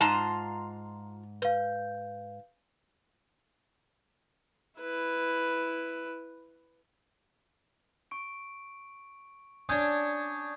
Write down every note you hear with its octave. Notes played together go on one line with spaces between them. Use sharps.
G#2 F4 A5 A#5 C6
B4 F5 G6
E4 B4
C#6 D7
C#4 D4 D#6 G6 G#6